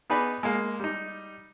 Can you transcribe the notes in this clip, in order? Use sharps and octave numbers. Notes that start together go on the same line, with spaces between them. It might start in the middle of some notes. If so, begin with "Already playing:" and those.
B3 D#4 G#4 B4 D5
G#3 A#3
G3 D#4